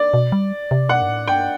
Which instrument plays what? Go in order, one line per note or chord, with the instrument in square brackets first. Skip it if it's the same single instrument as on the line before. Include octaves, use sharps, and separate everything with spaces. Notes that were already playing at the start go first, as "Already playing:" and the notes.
Already playing: [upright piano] D5
[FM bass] B2
G3
C3
[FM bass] B2 [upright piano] F#5
[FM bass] G2
A2
[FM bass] G2 [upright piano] G5